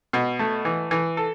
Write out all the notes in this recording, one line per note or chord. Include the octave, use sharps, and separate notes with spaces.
B2
A3
E3
E3
A4